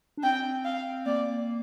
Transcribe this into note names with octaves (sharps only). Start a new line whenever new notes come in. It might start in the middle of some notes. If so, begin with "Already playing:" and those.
D4
C4 G5
F5
A#3 D5